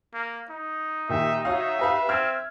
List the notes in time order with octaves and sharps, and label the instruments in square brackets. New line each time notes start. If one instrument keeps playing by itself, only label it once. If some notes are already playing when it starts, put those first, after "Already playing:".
[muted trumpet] A#3
D#4
[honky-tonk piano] A#2 D#3 G4 [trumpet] E5
[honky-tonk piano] F#4 C#5 F5 [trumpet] E5
[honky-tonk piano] G4 B4 F5
[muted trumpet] C4 [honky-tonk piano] F6 G#6